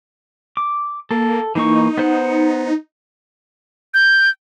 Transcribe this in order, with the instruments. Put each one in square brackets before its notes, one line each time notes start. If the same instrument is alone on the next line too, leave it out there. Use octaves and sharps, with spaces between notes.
[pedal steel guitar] D6
[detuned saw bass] A#3 [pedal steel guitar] A4
[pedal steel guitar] E3 A#3 C#6 [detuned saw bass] D#4
[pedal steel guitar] B3 C5 F#5
[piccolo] G6